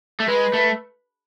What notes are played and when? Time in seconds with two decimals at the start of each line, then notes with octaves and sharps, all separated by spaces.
0.20 A3
0.29 G#3 B4
0.54 A3